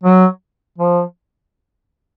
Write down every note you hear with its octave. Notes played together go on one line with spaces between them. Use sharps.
F#3
F3